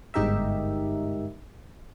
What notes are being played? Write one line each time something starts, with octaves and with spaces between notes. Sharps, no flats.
G1 G#2 D#4 G4 A#4 E5